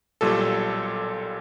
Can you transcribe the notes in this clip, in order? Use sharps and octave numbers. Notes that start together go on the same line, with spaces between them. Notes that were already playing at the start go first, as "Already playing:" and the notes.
B1 A#2 G3 A4